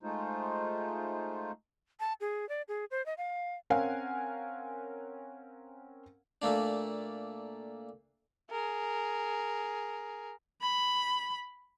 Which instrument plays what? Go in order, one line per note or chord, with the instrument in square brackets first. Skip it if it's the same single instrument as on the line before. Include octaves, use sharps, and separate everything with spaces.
[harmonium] G#3 A3 D#4 F4 C5
[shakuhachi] A5
G#4
D5
G#4
C5
D#5
F5
[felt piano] C4 C#4 A#4 F5 F#5 G#5
[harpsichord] A#2 A3 A#3 D4
[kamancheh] G#4 A#4
[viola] B5